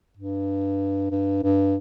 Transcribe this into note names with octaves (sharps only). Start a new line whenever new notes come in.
G2
G2
G2